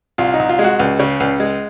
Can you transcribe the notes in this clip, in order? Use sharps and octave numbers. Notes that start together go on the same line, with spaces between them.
C2 F4
D#4
C2
F4
G#3
F#4
C#2
C#3
C#2
G#3